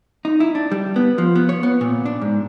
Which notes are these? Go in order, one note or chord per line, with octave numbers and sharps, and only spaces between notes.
D#4
E4
D4
G3
B3
F3
B3
C#5
B3
A#2
D4
G#2